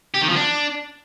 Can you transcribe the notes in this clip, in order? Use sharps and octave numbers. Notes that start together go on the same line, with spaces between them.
G4
D#3
F3
D4